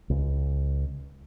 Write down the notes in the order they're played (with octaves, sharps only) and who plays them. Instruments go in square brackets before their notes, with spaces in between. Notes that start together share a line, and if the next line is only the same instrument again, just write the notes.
[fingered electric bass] C#2